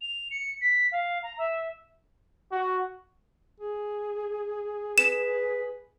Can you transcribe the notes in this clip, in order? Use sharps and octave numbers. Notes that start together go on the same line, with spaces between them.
F7
C#7
B6
F5
A#5
E5
F#4
G#4
B4 E7